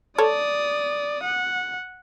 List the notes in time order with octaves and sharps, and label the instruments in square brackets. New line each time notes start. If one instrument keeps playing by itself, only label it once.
[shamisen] A4 C#5 [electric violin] D5 D#6
[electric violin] F#5